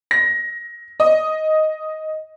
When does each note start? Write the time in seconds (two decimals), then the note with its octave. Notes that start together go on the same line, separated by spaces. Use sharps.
0.11 A#6
1.00 D#5